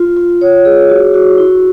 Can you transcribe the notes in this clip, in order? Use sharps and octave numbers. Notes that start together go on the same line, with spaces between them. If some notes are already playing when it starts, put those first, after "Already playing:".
Already playing: F4
F4
C#5
G#4
F#4
F#4
E4